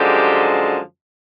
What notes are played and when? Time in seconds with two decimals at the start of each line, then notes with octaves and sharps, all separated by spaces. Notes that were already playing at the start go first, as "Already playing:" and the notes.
Already playing: F#2 D3 F3 G#3 G4